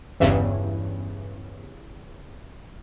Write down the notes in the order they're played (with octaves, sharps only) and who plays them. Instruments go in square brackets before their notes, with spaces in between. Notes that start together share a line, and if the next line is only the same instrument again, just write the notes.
[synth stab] G1 E2 G2 C#3 E3